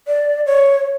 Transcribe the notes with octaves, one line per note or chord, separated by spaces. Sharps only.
D5
C#5